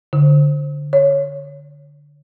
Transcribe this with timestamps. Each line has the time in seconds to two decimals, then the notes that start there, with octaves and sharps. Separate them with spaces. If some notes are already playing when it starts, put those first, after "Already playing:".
0.13 D3
0.93 C#5